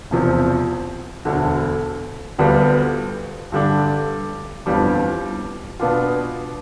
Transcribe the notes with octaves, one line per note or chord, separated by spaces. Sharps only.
E1 E2 C3 F3
E1 D2 D3
D2 D3 G3 B3 F4
G2 D3 G3 D4
G1 F2 E3 G3 D4
B2 B3 D4 F4